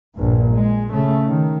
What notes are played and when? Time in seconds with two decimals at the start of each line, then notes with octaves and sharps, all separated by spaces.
0.15 A#1 G2
0.51 G#3
0.91 C#3 A3
1.28 D#3